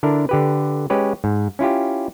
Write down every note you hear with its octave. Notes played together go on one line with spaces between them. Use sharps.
D3 D4 E4 A#4
D3 G4 B4
G#3 C#4 G4 B4 C#5
G#2
C#4 E4 F4 G4